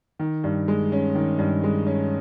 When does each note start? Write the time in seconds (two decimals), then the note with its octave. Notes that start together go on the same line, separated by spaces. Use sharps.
0.19 D#3
0.44 G2
0.68 G#3
0.92 C#4
1.15 D#3
1.39 G2
1.64 G#3
1.87 C#4